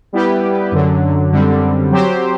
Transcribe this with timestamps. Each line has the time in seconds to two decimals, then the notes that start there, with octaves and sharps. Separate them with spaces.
0.13 G3 B3 E4 G4 B4
0.72 F#2 D3 F#3
1.32 F#2 D3 G3 C4
1.91 F#3 C4 G4 C5